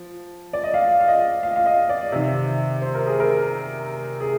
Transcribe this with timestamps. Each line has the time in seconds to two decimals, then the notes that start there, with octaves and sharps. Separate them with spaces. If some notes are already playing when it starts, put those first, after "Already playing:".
Already playing: F3
0.53 D5
0.64 D#5
0.74 F5
1.00 F5
1.08 D#5
1.43 F5
1.56 F5
1.66 D#5
1.89 D5
2.12 C3 D#3
2.82 C5
2.95 A#4
3.07 G#4
3.20 A#4
4.20 G#4